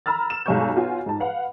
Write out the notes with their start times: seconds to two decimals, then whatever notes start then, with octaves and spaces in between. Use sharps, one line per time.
0.06 A#5 B5 E6 F6 A6
0.30 E7
0.46 B1 G2 G#3 G#5 C#6 G6
0.76 B3 F4 F#4 C#5 G#5
1.06 G#2 A5
1.20 B4 F5 F#5